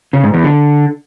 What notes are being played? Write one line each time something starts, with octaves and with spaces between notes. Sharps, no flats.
C#3
G#2
E2
D3